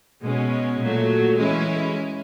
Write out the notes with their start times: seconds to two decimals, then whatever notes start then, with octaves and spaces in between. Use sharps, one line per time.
0.23 B2 G#3 C#4
0.81 A#2 F#3 A3
1.39 E3 G#3 C#4 E4